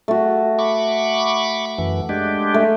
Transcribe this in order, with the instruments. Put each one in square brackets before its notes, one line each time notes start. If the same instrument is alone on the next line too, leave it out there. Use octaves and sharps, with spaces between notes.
[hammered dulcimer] A3 F#4
[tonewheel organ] B5 C#6 D6
F#2 E3
G#3 D4 G4
[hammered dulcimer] A3